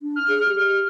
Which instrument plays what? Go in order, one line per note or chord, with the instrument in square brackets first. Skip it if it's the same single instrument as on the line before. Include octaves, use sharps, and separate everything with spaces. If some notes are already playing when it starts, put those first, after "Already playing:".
[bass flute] D4
[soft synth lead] F6
[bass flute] G#4
G4